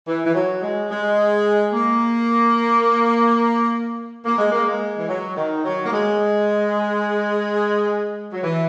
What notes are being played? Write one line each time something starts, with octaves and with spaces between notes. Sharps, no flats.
E3
E3
F#3
G#3
G#3
A#3
A#3
G#3
A#3
G#3
E3
F#3
D#3
F#3
A#3
G#3
F#3
E3